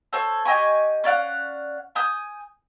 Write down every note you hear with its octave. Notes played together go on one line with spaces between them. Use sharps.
A4 C5 C#5
G4 D#5 G#5 C#6
C#4 D5 F5 F#5
G#5 D#6 G6